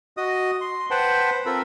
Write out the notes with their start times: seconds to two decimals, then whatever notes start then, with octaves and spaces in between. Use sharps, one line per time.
0.17 F#4 D#5 D#6
0.61 C6
0.91 B4 C5 F#5 G5 A5 B5
1.46 C4 F4 A4 A#4 B5 E6